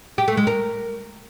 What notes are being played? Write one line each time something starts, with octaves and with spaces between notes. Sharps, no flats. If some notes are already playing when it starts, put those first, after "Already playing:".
G4
A3
G#3
A#4